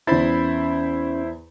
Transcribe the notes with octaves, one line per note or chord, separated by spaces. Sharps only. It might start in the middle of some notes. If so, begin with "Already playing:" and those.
E2 C#4 E4 C5 B5 A6